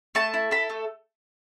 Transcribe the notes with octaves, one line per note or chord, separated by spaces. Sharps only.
A3 A5
E4
A4 B5
A3